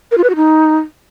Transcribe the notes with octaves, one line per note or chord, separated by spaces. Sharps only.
A#4
F4
B4
F#4
D#4